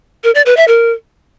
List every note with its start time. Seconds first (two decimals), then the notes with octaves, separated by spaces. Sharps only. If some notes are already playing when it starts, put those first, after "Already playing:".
0.24 A#4
0.35 D5
0.46 B4
0.57 E5
0.68 A#4